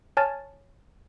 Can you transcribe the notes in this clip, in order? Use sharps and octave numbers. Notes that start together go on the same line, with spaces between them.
C#5 G#5 A5 F6 A6